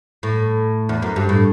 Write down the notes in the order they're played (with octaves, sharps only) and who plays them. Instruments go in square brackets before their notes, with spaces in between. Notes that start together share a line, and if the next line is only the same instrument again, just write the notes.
[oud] A2
E2
F#2
G2
A2